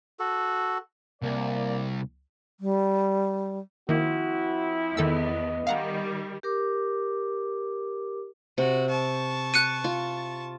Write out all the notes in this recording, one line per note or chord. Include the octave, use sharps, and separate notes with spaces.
F#4 A4
C2 A#3 D5
G3
D#3 F3 A#3 C4 E4 F#4
E2 D#3 B3 A4 D#5 E6
D#3 G3 F5 F#5 A#5
G4 A#4 D6
C3 F#4
A5 C#6
F#6 C#7 D#7
F4